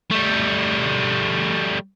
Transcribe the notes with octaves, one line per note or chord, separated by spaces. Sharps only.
G3 A3